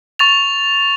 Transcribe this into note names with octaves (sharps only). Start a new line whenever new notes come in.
C#6 A6 F7